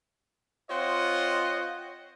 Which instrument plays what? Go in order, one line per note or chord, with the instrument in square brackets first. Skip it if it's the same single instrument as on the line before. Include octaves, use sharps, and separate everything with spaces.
[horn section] C4 F4 C5 C#5 D#5 F#5